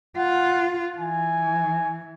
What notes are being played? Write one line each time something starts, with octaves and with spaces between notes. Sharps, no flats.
F4 F#5
E3 G#5